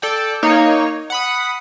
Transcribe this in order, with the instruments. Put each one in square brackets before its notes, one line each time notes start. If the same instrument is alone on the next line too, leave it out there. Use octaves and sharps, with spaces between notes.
[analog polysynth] A4 D5 G5
A#3 D#4 C#5
F#5 B5 D#6